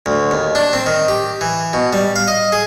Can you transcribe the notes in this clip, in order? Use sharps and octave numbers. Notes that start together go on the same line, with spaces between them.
D2
D#2
D4
C4
D#3
G4
E3
B2
G3
F5
D#5
G#4